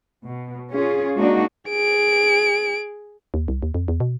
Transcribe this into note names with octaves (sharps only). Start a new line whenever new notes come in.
B2
C#4 F4 G#4
G#3 A#3 D4 D#4 F#4
G#4 D7
D#2
C2
D#2
F2
E2
B2